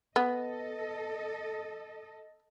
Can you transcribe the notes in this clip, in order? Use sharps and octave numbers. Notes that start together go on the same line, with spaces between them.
B3 A4 D#5